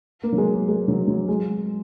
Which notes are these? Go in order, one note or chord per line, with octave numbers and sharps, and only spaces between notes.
A#3
F#3
G#3
A#3
G#3
F#3
F#3
G#3